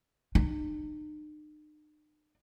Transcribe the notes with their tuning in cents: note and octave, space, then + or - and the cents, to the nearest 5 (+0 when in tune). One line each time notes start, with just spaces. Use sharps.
D#4 -45